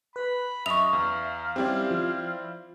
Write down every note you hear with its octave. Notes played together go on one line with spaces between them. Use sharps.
B4 B5
F#2 D#5 E5 C#6 F7
E2 F5
G3 C4 C#4 E4 G4 D5
F3